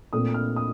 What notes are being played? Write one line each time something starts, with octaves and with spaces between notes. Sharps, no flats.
A#2 A3 C4 D#6
F6
D#6